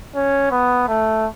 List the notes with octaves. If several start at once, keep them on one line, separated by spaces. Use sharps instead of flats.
C#4
B3
A3